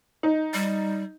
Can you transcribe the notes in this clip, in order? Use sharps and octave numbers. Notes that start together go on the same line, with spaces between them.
D#4
G3